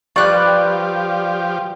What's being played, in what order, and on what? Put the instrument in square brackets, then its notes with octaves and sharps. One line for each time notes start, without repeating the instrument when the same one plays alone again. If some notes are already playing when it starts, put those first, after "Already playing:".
[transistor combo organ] F3 G4 [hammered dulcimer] G3 B4 F5 [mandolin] D5 F#6 [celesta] C#6